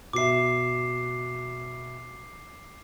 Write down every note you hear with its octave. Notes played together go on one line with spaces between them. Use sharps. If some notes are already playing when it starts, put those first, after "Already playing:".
B2 E5 D6 C7